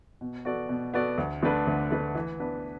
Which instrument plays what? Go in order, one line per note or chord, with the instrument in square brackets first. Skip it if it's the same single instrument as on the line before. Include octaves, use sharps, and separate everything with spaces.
[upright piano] B2
B3 F#4 A4 D5
B2
B3 F#4 A4 D5
D2
D3 A3 D4 B4
D2
D3 A3 D4 B4
E3
B3 D4 B4